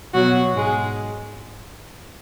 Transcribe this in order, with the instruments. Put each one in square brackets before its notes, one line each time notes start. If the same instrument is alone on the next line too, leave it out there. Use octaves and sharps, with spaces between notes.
[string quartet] B2 F#3 F#4
G#2 G#3